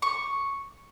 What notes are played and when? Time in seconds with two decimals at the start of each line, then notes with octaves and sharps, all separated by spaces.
0.02 C#6